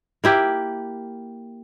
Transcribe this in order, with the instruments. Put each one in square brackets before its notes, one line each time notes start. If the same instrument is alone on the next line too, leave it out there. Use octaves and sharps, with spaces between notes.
[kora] A#3 E4 G4